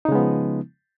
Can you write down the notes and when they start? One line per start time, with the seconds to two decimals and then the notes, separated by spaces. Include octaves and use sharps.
0.05 D#4
0.09 C#3
0.12 G#3
0.15 B3
0.19 F3